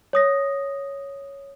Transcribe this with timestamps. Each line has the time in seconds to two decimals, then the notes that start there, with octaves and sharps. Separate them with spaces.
0.13 C#5 D#6 A#6